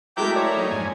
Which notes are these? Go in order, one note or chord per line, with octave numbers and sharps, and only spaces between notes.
F#3 G#3 A3 E4 A#4 G5 D6 G6
C#5 D5
F#3 A#3 D#4
F2 G#2 G#5